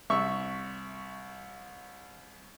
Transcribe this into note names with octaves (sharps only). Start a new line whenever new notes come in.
C2 E5 C#6